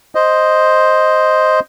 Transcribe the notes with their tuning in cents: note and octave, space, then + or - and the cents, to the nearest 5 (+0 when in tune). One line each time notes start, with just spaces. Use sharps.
C5 +0 D#5 +0